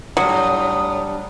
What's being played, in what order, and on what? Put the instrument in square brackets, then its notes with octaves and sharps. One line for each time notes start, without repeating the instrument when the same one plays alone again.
[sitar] D#2 A2 [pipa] F#3 [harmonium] G3 D4 [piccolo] D#6